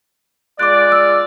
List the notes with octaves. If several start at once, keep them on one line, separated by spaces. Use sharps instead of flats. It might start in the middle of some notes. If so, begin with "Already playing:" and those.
G#3 F4 D5 D6 F#6
E6